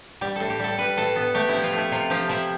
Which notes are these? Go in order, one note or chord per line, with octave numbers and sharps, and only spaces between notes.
G3 G4
A2 A4
G4
G3 A4
G3 B4
A2 A4
B3 A4
A3 G4
F3 E4
F4
A3 E4
C3 F4
F3 G4
F3 E4